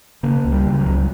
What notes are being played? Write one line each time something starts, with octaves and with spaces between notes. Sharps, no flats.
C#3 A#3
C#2
G3
C#3
F#3
C#2